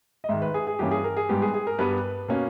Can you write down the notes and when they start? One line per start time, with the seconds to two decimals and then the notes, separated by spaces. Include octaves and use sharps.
0.24 D#5
0.29 G#2 D#3 G#3 E5
0.42 B4
0.54 G#4
0.67 G#4
0.79 G2 E3 A#3 C#4 G4
0.91 G#4
1.04 A#4
1.17 G#4
1.29 G#2 G3 B3 G4
1.42 G#4
1.54 G#4
1.67 A#4
1.79 G2 G3 B3 B4
2.28 B2 A#3 C#4